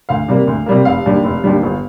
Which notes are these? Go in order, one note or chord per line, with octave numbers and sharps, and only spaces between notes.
D2 F5
C3 G3 A#3
D2
C3 G3 A#3
F1 F5
D#2 D3 G3
F1
D#2 D3 G3
G1